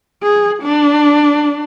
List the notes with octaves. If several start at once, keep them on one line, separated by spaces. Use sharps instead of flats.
G#4
D4